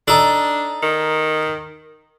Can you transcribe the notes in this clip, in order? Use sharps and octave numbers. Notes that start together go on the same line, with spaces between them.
D4 D#4 A4
D#3